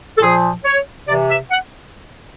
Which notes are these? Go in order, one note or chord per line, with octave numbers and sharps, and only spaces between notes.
A4
A#2 F3 G#4
C#5
C3 E3 D5
E5
F#5